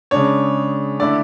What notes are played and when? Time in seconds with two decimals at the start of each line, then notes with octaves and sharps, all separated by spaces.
0.11 C#3 G#3 D4 C#5
1.00 D3 A3 E4 D5